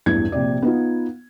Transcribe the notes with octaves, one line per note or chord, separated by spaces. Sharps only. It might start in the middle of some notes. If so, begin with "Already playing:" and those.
A1 E2 G2 E3 G#6
A#1 C3 D5
B3 D#4 F4